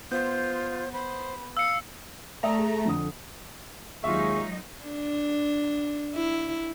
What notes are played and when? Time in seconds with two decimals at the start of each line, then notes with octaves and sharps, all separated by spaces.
0.11 B3 F4 C5 G6
0.93 C5 B5
1.57 F5 E6 C#7
2.43 A3 D5 E5 A#5 D#6
2.59 G#4
2.86 F2 D3 D#6
4.04 D#2 F#3 G#3 D#4 F4 G#4 E5 C#6
4.86 D4
6.15 E4